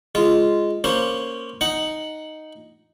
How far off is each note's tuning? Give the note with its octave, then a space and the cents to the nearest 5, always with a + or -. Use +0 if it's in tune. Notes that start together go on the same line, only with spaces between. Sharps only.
G#3 +0 F4 -10
A#3 +0 C#4 +0 C5 +0
D#4 +0 F#5 +5